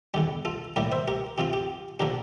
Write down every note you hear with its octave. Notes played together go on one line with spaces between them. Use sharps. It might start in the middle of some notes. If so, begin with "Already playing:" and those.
E2 D3 G3 G4
F4 A4
A2 G3 A#3 E4 G4 A#4
C5 E5
G4 A#4
C3 F3 C4 F4 G4
G4
D3 F3 A#3 D4 G4 A#4